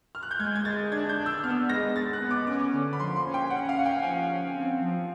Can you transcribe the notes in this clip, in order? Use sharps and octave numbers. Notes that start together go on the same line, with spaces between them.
F6
F#6
G6
G#3 G#6
G#6
G#3 A6
D4 G#6
G6
D4
E6
B3 F6
G#3 A#6
G#3 A6
F#6
B3
D6
C#4 D6
D3
B5
F3 C6
C6
C#4
G5
C#4 F#5
F5
C#4 F#5
G5
F3 G#5
C#4
C4
F3